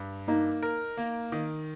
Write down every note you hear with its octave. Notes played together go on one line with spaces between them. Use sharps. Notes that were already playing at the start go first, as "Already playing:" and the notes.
Already playing: G2
A#3 D#4
A#4
A#3
D#3